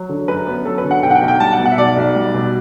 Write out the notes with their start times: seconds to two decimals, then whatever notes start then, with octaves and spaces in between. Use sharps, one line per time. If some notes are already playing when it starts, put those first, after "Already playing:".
Already playing: F#3
0.09 D3
0.28 F#2 B4
0.47 B3
0.65 F#3 A4
0.78 B4
0.84 D3
0.91 F#5
1.03 B1 G5
1.11 F#5
1.15 G5
1.22 B1
1.28 G5
1.40 G3 A5
1.53 F#5
1.59 B2
1.65 F#5
1.72 E5
1.78 B1 D5
1.97 B1
2.15 G3
2.34 B2